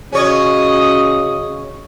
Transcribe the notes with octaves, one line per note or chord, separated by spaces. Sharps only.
C#3 C#4 F#4 C#5 D#5